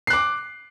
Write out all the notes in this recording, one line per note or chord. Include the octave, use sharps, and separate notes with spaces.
D6 F#6 C7